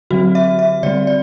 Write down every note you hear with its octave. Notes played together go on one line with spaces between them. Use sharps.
D3 F#3 C4 F#4
E5
E5
D3 G3 C4 D5
D5